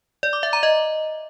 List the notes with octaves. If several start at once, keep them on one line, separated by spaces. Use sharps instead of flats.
D5
D6
E5
A#5
D#5